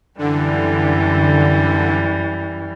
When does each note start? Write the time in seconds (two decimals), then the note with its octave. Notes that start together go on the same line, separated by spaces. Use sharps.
0.18 F#2 D3 E3 G3